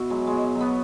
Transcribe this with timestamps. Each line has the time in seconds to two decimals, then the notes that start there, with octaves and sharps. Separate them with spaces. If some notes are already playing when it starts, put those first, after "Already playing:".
Already playing: B2 E4 F#4
0.10 F#3 G#3
0.27 G#3
0.33 B2
0.55 F#3
0.61 B3